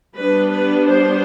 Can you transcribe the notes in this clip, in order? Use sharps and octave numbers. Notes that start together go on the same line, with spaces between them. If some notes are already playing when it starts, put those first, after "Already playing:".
G3 B3 D4 B4
B4
C5